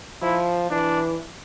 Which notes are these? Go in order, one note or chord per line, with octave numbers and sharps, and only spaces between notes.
F3 E4
E3 D4